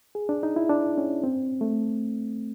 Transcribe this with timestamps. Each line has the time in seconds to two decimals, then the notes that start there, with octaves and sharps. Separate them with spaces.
0.15 G#4
0.29 D4
0.43 D#4
0.56 E4
0.69 D4
0.98 C#4
1.24 C4
1.61 A3